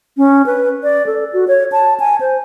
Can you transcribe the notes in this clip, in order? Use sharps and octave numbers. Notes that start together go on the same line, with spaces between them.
C#4
B4
D5
A4
F#4
C#5
A5
G#5
C5